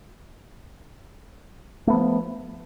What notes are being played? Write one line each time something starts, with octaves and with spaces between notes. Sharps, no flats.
F3 A3 B3